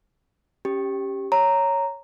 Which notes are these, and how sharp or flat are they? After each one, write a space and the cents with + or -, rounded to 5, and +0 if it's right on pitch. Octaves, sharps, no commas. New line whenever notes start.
C#4 +0 G4 +0
C#5 +0 A#5 -5